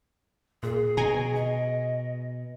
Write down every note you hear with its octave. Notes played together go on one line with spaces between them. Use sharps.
A#2 G#4
B2 G#5 A#5
D#5